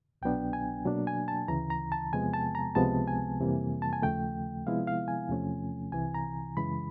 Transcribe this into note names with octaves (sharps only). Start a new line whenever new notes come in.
C2 B2 F#3 B3 D4 G5
G#5
B2 F#3 A#3 D4
G#5
A5
D2 C#3 E3 A#5
A#5
A5
E2 C3 F3 G#3 B3 G#5
A5
A#5
C#2 C3 F3 G#3 B3 A5
G#5
F2 C3 E3 G3 A#3
A5
G#5
D#2 C#3 F3 A3 G5
C3 F3 G#3 B3 E4 F5
F5
G#5
E2 C3 F3 A3 C#4
C2 C3 E3 G#5
A#5
F#2 C#3 E3 G#3 B5